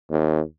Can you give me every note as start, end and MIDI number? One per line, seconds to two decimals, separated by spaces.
0.10 0.41 39